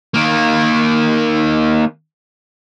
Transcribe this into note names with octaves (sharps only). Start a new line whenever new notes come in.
D#3 A#3